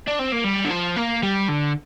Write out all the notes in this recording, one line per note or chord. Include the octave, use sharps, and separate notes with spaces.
D4
C4
A#3
G3
D3
F3
A#3
G3
D3